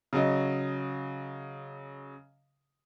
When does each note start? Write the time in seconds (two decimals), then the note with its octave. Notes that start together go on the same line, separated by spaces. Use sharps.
0.13 C#3 F#3 D#5